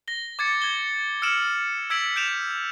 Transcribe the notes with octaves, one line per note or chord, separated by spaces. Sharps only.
A#6 G7
D6 G#6 A6 C#7
G#6 G7
E6 F6 C#7 D7 E7 F#7
E6 G#6 B6 D7 F#7
G6 D7 E7 F7